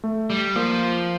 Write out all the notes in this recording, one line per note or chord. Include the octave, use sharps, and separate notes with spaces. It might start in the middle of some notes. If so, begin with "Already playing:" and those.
A3
G3
F3 A#3